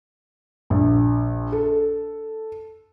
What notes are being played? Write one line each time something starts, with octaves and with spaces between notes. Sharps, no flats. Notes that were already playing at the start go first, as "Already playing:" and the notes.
A#1
A4